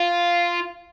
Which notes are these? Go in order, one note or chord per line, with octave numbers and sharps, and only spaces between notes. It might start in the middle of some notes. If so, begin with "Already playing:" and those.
Already playing: F4